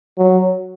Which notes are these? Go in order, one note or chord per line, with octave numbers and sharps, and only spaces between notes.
F#3